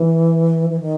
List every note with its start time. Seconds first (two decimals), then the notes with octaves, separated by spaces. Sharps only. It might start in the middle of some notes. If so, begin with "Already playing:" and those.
Already playing: E3
0.70 E3
0.80 D#3